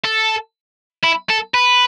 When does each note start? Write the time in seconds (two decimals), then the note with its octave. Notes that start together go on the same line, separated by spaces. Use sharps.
0.04 A4
1.04 E4
1.30 A4
1.54 B4